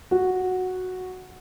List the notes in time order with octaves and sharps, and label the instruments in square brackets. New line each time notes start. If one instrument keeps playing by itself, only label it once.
[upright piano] F#4